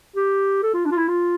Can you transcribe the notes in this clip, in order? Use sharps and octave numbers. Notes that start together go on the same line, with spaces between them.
G4
A4
F4
D4
F4
E4
F4